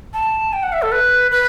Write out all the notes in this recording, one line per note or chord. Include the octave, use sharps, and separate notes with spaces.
A5
G5
F#5
E5
A4
B4
B4